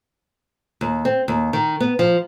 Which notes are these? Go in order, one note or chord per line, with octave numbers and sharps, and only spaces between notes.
D#2
C4
D#2
D#3
B3
F3